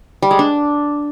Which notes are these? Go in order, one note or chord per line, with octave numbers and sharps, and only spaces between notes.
G3
G#3
D4